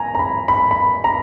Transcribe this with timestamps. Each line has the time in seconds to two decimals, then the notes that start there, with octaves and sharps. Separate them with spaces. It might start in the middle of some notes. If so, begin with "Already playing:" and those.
Already playing: G#5 A#5
0.15 A#5
0.19 B5
0.48 B5
0.71 B5
1.04 A#5